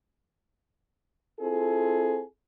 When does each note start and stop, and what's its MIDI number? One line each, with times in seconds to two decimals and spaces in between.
1.40 2.21 60
1.40 2.21 64
1.40 2.21 65
1.40 2.21 68
1.40 2.21 69